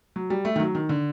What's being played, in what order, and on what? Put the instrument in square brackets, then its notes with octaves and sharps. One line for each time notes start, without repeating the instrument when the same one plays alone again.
[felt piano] F#3
G3
A3
D#3
F#3
D#3
D3